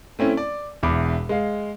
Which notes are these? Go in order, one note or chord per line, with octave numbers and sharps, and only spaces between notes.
A3 C4 C#4 E4
D5
E1 E2 B5 D6
G#3 F5